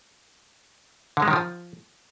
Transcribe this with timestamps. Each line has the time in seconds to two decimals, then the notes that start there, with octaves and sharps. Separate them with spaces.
1.17 D3
1.22 G#3
1.28 D#3
1.33 F3